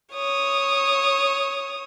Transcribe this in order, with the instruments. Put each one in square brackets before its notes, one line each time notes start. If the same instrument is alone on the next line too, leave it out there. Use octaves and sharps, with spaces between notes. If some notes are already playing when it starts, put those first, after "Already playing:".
[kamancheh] C#5 D#6